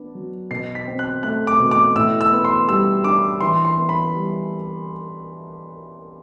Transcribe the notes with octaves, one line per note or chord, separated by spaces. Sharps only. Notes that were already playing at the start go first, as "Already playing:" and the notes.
Already playing: B3 D4
F#3
B2 C7
B6
C4
F#6
A3 F#6
D6
B2
D6
A2 E6
E6
B3
C6
G3 E6
D4 D6
E3 C6
C6
B3
B5
G3